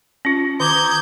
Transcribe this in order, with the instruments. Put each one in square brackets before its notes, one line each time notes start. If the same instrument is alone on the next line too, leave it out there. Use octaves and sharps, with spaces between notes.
[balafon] C#4 F4
[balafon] D#3 [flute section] A#5 D6 D#6 [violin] G6 G#6